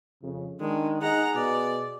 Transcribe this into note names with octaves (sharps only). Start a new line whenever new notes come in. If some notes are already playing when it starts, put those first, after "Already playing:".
F2 C#3
D#3 G#3 D4
D#4 G#4 F#5 A#5
B2 D5